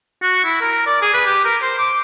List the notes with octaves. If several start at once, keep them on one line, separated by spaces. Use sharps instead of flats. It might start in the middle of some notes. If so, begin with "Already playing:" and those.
F#4
E4
A#4
D5
G#4
B4
G4
A#4
C5
D6